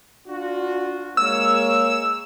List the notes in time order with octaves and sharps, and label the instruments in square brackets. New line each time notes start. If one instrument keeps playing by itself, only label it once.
[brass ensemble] D4 F4 F#4
[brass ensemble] G#3 A#3 C#5 [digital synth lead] E6